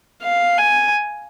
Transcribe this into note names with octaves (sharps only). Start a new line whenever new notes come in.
F5
G#5